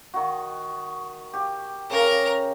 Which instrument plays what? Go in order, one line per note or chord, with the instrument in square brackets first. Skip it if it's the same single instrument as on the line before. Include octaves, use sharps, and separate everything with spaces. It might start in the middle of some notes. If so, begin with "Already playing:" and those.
[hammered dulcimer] D#3 F#4
G4
[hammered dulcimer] C#3 [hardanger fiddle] A#4 A#5